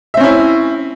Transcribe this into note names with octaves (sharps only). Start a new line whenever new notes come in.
C4 C#4 E4 E5